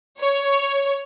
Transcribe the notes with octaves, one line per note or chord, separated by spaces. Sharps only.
C#5